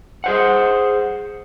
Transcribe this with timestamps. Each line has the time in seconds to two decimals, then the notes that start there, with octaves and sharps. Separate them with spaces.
0.24 G#4 C5 F#5